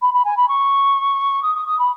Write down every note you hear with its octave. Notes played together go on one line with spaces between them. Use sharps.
B5
B5
G#5
B5
C#6
D#6
D#6
D#6
B5